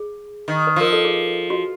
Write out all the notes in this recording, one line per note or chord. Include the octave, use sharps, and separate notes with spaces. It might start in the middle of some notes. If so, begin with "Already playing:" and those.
Already playing: G#4
D#3
B4
F3 A#4
A4
G#4
F#4